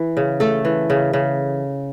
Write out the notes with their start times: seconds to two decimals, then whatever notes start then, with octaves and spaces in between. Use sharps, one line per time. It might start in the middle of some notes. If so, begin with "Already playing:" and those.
Already playing: E3
0.17 C#3
0.40 A3 A4
0.65 E3
0.90 C#3
1.13 C#3